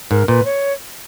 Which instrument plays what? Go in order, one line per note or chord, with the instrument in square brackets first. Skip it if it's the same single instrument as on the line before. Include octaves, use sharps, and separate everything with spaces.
[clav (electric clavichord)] G#2 [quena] A#4
[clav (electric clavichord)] A#2 [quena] B4
[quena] C#5